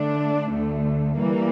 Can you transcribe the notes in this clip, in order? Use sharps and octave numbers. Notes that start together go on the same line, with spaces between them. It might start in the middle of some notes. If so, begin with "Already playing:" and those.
Already playing: D3 A3 D4
D2 D3 A3
E3 G3 A#3